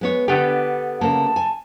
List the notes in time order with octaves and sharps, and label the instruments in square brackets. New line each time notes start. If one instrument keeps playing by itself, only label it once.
[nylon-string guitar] G#3 B3 C#5
[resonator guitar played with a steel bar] D3 B3 G4 [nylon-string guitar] A4
[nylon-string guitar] C#3 A#3 [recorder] A5
[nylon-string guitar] G#5